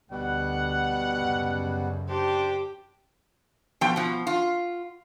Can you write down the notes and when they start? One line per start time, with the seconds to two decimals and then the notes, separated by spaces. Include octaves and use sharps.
0.11 D2 B2 G3 F#5
1.15 F#2 C#3
2.08 D4 G4 C5
3.81 B2 F3 G5
3.96 B2 F3
4.27 F4